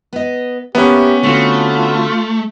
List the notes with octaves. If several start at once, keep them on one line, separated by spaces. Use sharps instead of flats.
B3 D#5
A#3 B3 C#4 G4 E5
D3 A3 C4 F4 F#4